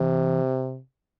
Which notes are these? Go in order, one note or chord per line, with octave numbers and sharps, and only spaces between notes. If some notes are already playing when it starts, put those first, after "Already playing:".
Already playing: C3 E3